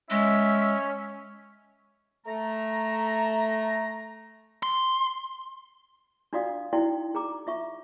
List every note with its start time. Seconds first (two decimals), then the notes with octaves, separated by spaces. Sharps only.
0.10 G#3 C#4 E5
2.26 A3 A#5
4.63 C6
6.33 D4 F4 F#4 D5 F5 D#6
6.73 D#4 E4 F#4 D5 G5 C6
7.15 G#4 A#5 D6
7.47 F4 E5 C#6